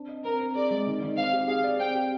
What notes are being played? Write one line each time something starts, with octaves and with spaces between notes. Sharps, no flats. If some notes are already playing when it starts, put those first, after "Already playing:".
Already playing: C4 D4
D#5
C4 A#4
C4
G#4 D5
G#3
D#3
D#3
C4 F5
G4
G#4 F5
D5
C4 G5
G4